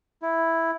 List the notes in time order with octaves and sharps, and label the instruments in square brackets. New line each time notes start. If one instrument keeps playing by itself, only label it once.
[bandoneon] E4